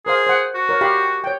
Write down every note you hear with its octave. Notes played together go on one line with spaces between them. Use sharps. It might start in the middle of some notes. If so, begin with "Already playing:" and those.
G#4 A#4 C5 F5
C5 F#5
F#4
A#4 C#5
G4 F5 B5
C#5 G5